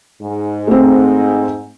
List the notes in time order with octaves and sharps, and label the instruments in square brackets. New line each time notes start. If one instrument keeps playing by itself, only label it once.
[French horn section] G#2
[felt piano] A3 C4